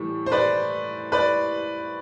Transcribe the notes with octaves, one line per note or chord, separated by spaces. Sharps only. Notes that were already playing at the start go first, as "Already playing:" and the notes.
Already playing: A2 E3 G3
C5
B4 D5
B4 D5